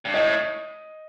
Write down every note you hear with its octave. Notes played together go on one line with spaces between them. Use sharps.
G2
A2 D#5